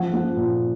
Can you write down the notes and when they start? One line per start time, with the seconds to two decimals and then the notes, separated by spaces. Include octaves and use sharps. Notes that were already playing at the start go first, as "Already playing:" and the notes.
Already playing: F3 F#5
0.13 F3
0.37 A#2